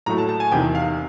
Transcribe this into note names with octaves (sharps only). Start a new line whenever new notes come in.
A2 F#3 A3 A#5
A5
A5
G#5
E2 C3 D#3 G5
F5